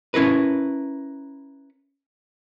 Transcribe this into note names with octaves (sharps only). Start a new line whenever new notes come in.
C#4 E4 A#4 B4